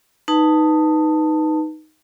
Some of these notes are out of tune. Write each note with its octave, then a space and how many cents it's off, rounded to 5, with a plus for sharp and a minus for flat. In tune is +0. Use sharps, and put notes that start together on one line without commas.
D#4 +0 B4 +0 A5 +15